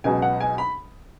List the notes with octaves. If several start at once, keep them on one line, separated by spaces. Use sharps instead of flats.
C#2 B2 F#3 G#5
F#5
G#5
B5